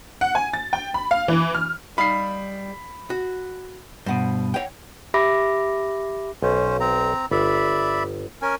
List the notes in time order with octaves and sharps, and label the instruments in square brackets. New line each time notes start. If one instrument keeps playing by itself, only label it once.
[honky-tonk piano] F#5
G#5
A6
G5
B5
F5
E3
F6
[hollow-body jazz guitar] G3 D#4 F5 [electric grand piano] B5 C7
[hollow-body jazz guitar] F#4
[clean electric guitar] G2 B2 [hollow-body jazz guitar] C5 F#5
[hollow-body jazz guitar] C#5 F#5 G5
[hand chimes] G4 E5 B5 D6 A#6
[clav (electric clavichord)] B1 [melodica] C#4 C5
[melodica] C4 A#5
[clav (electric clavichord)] G1 [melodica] D5 E5 B5
[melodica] C#4 A#4 G#5